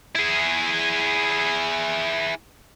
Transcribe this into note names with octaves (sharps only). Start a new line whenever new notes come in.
E4 G#4